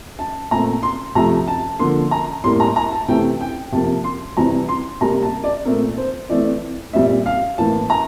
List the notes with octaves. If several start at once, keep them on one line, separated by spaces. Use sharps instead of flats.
A5
A#2 A3 C4 A#5
C6
C3 F3 A3 A#5
A5
D3 F3 A#3 C6
A#5
A2 G3 A#3 C6
A#5
A#5
A5
C3 E3 A3 C4 G5
G5
C3 F3 A#3 A5
C6
C3 E3 G3 C4 A#5
C6
C3 G3 A#3 A#5
A5
D5
A#2 A3 C4 A#4
C5
E3 A3 C4 D5
A#2 G3 C4 E5
F5
A2 E3 A#3 A5
A#5